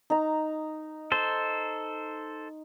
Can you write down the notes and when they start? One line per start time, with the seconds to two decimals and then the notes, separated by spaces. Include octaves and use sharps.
0.10 D#4 A#5
1.12 A4 C5 C6